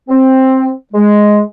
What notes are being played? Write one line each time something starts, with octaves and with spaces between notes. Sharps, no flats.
C4
G#3